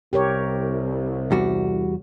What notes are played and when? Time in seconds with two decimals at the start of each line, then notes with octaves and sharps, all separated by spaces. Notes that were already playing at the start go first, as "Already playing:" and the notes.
0.13 C2 G4 A#4 C#5
1.31 E2 G3 F#4